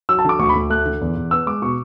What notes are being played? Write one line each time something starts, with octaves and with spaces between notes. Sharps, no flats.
F#3 E6
A5
D3 D6
D2 C#6
B5
D2
A3 F#6
D3
E2
E2
B3 E6
G#3 D6
B2 C#6